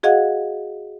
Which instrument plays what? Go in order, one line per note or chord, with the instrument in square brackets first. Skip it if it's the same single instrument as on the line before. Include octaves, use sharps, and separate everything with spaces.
[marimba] F#4 G#4 D#5 F5 F#5